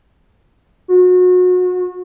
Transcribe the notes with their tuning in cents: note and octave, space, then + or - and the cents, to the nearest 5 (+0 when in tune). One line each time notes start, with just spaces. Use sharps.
F#4 -30